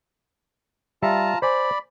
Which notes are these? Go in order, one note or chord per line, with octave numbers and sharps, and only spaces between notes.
G3 F4 E5 A5 A#5
C5 D5 G#5 B5